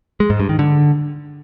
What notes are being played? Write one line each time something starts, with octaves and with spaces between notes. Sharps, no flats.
G#3
G#2
G2
D#3
D3